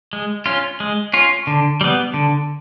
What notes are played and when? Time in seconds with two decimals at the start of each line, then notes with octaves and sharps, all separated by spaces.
0.13 G#3
0.46 C#4 F4
0.80 G#3
1.13 C#4 F4
1.47 D3
1.81 G3 B3
2.14 D3